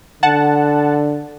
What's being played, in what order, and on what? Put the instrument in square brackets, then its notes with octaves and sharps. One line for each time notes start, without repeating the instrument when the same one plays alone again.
[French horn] D3 [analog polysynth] F#5 A5